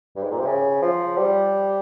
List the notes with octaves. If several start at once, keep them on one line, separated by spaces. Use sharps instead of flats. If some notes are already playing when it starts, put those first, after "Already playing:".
G2
G#2
A#2
C3
C#3
F3
G3